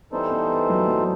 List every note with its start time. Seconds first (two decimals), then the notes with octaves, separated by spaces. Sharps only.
0.12 E3 G3 B3 D#4 A4 C5
0.31 B3
0.70 F#3
0.88 F#3